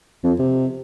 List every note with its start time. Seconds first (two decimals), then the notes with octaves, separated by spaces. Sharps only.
0.24 F2
0.39 C3